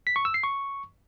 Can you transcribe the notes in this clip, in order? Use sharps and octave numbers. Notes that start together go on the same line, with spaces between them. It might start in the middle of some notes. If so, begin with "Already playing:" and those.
B6
C#6
E6
C7
C#6